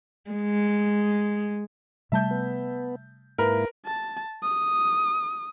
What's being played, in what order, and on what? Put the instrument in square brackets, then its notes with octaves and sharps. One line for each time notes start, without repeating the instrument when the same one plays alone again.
[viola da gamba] G#3
[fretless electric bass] C3 G3 A3 [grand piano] E5 A5 G6
[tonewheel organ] B3
[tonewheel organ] G#2 A#3 E4 [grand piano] A#4 B4
[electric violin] A5
D#6